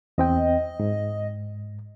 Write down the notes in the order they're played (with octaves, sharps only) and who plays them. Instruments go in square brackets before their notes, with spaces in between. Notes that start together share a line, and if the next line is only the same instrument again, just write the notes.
[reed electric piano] E2 C4 G5 [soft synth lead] D#5
[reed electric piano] G#2